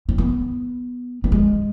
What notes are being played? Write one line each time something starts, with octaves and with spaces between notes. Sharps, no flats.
C4
B3
B3
G#3